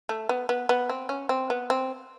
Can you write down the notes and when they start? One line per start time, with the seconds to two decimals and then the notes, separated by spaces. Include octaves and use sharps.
0.09 A3
0.29 B3
0.49 B3
0.69 B3
0.89 C4
1.09 C#4
1.29 C4
1.50 B3
1.70 C4